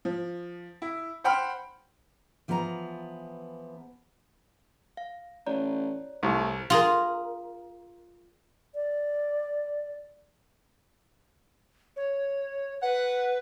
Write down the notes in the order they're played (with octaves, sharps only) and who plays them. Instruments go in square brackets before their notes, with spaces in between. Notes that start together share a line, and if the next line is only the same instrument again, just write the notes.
[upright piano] F3
E4
C5 F#5 G5 B5 F6
[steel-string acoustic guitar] E3 F3 B3 G#4 F#5 A#5
[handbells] F5
[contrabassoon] A1 [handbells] C#5 D5 A#5
[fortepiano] C2 [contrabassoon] A2 [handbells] A#5
[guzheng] F4 G#4 A#4
[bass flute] D5
[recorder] C#5
[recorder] B4 [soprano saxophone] F#5